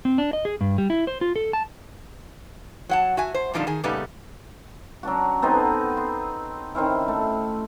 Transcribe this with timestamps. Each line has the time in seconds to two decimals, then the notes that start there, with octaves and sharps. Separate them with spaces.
0.05 C4
0.18 D4
0.33 D#5
0.45 G#4
0.61 G2
0.78 G3
0.90 E4
1.07 C5
1.21 F4
1.36 A4
1.53 A5
2.89 F#3 F#5 A5
3.17 F#4 E5 G#5
3.34 C5
3.54 A#2 D3 F3 G3 D4 D#4
3.67 D#3 G#4
3.84 A#2 C#3 G3 A3 B3 D#4
5.03 F#3 C#4 D4 F#4
5.42 B3 C4 D#4 A4
5.97 C6
6.75 D#3 C4 C#4 E4
7.08 A3